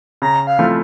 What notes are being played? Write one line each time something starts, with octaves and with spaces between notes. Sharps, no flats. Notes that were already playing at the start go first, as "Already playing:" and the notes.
C#3 A#5
F5
F3 A3 C4 E4